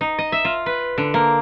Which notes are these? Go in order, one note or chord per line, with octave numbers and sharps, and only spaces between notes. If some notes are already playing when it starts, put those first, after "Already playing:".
D#4
D#5
E5
F4
B4
D3
A#3